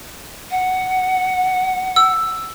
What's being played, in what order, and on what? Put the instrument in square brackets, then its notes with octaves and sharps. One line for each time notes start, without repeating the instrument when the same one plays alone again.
[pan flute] F#5
[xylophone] E6